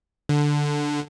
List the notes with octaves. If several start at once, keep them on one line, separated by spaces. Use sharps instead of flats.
D3